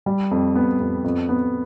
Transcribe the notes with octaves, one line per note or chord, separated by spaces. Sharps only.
G3
F2
B3
F2
F2
B3